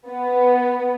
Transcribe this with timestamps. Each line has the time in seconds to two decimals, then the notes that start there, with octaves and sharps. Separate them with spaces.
0.10 B3